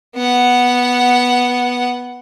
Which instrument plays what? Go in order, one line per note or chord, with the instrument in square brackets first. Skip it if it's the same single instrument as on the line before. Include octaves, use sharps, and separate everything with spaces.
[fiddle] B3 F#5